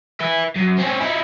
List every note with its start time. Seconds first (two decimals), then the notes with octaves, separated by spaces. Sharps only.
0.20 B4 E5
0.56 F#2
0.78 C4 C#4
1.01 D#4 E4